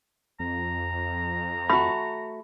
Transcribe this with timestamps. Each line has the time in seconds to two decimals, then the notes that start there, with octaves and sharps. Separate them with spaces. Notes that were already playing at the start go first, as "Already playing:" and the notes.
0.40 F2 A#5
1.70 A3 F#4 B5